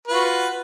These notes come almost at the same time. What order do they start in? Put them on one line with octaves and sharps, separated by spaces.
B4 F4 F#4